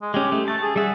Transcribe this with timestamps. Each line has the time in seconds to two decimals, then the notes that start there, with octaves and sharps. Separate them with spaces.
0.02 G#3
0.14 G#3 C#4 G4
0.32 A3
0.48 A3 A5
0.62 G#4
0.76 G3 G#4 E5 F#5